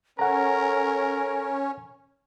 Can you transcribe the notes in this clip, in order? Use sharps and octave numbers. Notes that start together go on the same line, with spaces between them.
C#4 A4 A#4 F#5 A#5